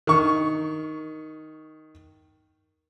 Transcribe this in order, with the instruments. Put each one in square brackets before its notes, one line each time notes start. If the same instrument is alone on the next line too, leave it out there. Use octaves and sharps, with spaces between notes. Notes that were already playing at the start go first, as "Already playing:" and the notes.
[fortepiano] D#3 C#6